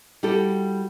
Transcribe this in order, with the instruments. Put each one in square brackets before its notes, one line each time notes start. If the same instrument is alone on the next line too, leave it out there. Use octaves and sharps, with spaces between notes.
[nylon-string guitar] G3 E4 F#4 G4 A4